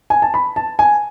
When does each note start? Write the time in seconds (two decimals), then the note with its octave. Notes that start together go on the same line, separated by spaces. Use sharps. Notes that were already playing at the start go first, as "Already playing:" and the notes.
0.10 G#5
0.22 A5
0.34 B5
0.56 A5
0.79 G#5